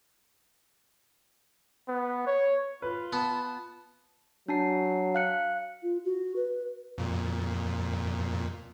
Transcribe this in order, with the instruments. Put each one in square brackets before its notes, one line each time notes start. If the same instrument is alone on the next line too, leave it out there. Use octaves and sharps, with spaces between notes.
[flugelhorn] B3
C#5
[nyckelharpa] F4 [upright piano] B4
[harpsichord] B3 [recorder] A5
[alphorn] F#3 [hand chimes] D4 A5 C7
[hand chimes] F5 F#6 C#7
[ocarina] F4
F#4
B4
[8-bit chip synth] F2 A#2